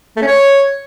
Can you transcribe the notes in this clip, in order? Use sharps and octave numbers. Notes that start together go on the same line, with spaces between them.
A3
C#4
C#5